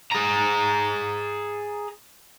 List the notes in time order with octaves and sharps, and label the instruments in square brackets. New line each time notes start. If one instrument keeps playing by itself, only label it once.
[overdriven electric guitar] G#4 A#5